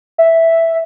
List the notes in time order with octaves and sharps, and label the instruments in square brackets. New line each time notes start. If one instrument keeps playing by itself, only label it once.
[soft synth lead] E5